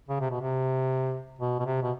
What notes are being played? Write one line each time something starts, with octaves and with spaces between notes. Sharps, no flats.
C#3
C3
B2
C3
B2
B2
C3
B2